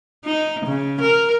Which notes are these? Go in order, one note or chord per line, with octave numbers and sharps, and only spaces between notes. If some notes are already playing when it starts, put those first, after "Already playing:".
D#4
C#3
A#4